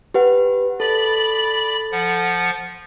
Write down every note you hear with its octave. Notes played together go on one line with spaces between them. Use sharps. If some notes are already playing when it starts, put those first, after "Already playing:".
G4 B4 F#5
A4 D5 B5
F3 F#5